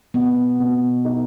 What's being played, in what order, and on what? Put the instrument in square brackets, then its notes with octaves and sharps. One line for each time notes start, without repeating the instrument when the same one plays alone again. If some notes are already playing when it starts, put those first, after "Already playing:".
[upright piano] B2 [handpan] B3
[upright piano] B2
D#4